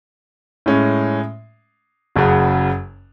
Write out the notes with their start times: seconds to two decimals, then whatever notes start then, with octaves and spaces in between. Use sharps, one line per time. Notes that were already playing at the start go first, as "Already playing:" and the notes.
0.66 A2 G#3 C#4
2.16 F#1 F#2 C#3 F#3